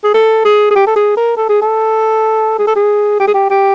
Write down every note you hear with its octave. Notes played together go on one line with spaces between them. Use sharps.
G#4
A4
G#4
G#4
G4
A4
G#4
A#4
A4
G#4
A4
G#4
A4
G#4
G4
G#4
G4
G4